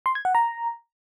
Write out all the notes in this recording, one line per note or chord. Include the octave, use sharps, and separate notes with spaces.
C6
G#6
F#5
A#5